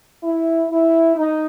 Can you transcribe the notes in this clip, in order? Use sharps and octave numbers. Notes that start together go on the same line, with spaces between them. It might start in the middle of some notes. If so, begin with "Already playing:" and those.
E4
E4
D#4